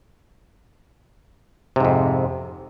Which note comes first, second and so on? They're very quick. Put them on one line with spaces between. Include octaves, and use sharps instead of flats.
C3 G#2 F2